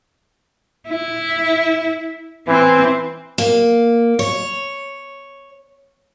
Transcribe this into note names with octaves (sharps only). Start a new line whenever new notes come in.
E4
E3 C4
A#3
C#5